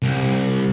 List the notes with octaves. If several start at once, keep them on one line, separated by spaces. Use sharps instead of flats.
C2